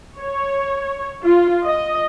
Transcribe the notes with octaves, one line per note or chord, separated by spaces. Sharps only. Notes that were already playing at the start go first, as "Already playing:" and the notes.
C#5
F4
D#5